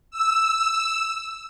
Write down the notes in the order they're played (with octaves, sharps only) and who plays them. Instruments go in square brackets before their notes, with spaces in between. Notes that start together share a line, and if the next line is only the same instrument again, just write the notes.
[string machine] E6